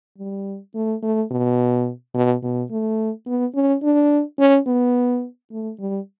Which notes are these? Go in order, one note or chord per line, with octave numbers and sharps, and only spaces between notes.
G3
A3
A3
B2
B2
B2
A3
B3
C#4
D4
C#4
B3
A3
G3